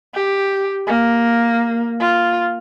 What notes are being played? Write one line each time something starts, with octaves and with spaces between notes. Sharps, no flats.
G4
A#3
F4